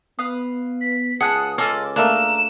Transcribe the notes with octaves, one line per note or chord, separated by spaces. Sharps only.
B3 B4 F5 D#6
B6
C#2 G#4 F#5 A5 D#6 F#6
C#4 F4 A4 D#5 A5 D6
A3 A#3 D4 A#5 E7